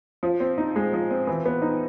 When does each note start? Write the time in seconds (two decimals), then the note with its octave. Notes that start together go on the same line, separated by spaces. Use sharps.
0.23 F3
0.40 C4
0.58 D#4
0.76 G#3
0.93 F3
1.10 C4
1.27 E3
1.46 B3
1.62 D#4